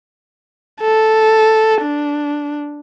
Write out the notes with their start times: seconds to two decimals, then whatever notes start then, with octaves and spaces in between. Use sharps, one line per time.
0.81 A4
1.82 D4